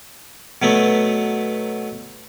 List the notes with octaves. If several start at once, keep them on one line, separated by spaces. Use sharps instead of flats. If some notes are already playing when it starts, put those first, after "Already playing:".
B2 F#3 A3 B3